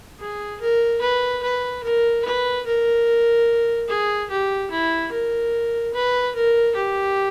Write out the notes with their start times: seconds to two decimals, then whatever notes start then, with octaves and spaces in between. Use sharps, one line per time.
0.20 G#4
0.61 A#4
1.01 B4
1.42 B4
1.83 A#4
2.25 B4
2.66 A#4
3.88 G#4
4.30 G4
4.71 E4
5.12 A#4
5.94 B4
6.35 A#4
6.76 G4